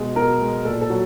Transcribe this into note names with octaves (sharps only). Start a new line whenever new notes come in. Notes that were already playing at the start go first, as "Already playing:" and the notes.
Already playing: B2 G#3
B2 A#4
G#3
A#2 A4
A4
F#3